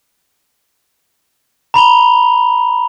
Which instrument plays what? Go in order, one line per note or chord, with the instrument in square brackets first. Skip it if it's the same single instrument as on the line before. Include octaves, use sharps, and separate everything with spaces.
[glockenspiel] A#5 B5 F7 G7